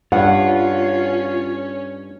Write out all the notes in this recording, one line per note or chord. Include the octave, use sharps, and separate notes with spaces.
G2 C#4 F4 F#5